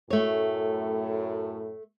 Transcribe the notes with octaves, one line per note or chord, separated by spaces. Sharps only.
F#2 A2 A3 C#5